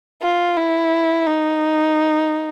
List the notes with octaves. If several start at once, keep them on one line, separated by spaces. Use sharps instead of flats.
F4
E4
D#4